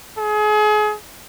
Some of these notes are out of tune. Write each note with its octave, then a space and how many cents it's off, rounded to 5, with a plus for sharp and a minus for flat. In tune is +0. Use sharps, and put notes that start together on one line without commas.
G#4 +35